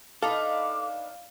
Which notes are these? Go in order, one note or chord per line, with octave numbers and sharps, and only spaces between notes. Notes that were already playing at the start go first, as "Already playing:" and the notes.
D4 D#4 A4 B4 F5 D6